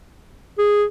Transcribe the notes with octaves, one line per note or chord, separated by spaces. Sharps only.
G#4